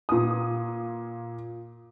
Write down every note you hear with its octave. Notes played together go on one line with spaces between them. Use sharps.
A#2 D#6